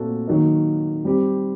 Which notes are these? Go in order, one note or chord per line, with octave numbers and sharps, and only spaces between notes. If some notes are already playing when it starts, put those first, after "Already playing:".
Already playing: A#2 A3 C4 F#4 A4
D#3 F#3 A#3 D#4
G3 C4 G4